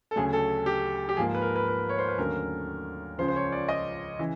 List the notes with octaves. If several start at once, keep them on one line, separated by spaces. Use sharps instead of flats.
A4
D2 C#3 F#3 A3 G#4
A4
G4
G4
G#2 F3 A#3 G#4
B4
A#4
B4
B4
C#5
C5
B4
D#2 D3 F#3 A3 C#4 A#4
C#2 C#3 F3 C5
C5
C#5
D5
D#5
C#3 E3